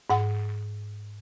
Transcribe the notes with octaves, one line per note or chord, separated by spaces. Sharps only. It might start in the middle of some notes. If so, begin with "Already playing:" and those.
G#2 F#5